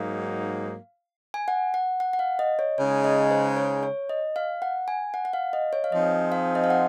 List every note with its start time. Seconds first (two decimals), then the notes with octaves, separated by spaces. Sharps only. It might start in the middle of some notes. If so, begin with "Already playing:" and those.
Already playing: G#2 F#3 A#3 D#4 F#4 F5
1.34 G#5
1.48 F#5
1.74 F#5
2.00 F#5
2.13 F#5
2.19 F5
2.39 D#5
2.59 C#5
2.78 C#3 G#3 D#4 C#5
3.04 D#5
3.31 C5
3.57 C#5
3.83 C#5
4.09 D#5
4.36 F5
4.62 F#5
4.88 G#5
5.14 F#5
5.25 F#5
5.33 F5
5.53 D#5
5.73 C#5
5.84 F5
5.92 F3 C4 D#4 G#4 C5 D#5
6.32 F5
6.55 D#5
6.64 F5
6.70 F#5